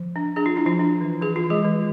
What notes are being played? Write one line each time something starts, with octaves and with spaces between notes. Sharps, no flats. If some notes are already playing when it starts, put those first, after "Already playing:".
Already playing: F3
D4
D4 G#4
F4
D4 E4
F3 F4
D4
E3
E3 G#4
F4
E3
G#3 G#4
E3